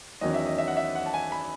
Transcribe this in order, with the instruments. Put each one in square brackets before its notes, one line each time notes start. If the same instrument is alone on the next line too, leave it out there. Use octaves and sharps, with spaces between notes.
[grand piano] E2 D#3 F#3 C#4 D#5
E5
D#5
E5
F#5
E5
F#5
A5
G#5
B5